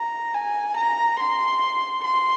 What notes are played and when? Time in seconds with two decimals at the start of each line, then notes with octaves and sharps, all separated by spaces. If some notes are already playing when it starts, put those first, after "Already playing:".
Already playing: A#5
0.34 G#5
0.77 A#5
1.19 C6
2.04 C6